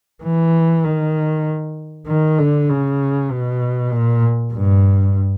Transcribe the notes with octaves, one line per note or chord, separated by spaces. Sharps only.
E3
D#3
D#3
D3
C#3
B2
A#2
G2